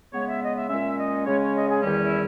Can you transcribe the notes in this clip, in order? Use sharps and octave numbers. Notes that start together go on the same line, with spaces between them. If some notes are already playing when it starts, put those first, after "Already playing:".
C#3 G#3 B3 C#5
E5
D#5
E5
A#2 G#3 C#4 E5
D#5
C#3 G#3 C#4 C#5
C#5
D#5
G#4
E2 D#3 G3 C#4 G4
E4